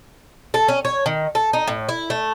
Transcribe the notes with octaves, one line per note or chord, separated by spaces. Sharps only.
A4
C#4
C#5
D#3
A4
D#4
A2
E4
A3